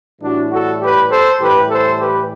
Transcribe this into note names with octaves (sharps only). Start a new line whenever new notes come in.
A2 E3 G3 D4 F#4
F#4 A4
G4 B4
A4 C5
A2 E3 G3 G4 B4
A4 C5
G4 B4